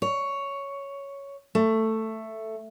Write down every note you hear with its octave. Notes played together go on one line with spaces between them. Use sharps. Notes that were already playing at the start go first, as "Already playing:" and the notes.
C#5
A3